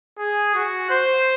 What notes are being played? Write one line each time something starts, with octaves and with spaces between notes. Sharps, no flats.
G#4
F#4
C5